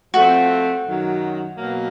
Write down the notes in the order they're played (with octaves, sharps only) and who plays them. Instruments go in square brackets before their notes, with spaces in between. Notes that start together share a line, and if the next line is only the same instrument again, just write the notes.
[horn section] F3 A3 C4 [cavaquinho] F#4
[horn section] F#2 D#3 F#3
B2 F#3 A#3